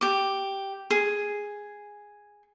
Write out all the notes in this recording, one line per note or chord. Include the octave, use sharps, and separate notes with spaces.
G4 D6
G#4